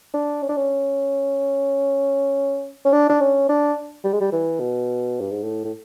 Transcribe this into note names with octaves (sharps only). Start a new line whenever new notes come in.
D4
C#4
D4
C#4
C#4
D4
D4
C#4
D4
G3
G#3
G3
E3
B2
G2
G#2
A2
A2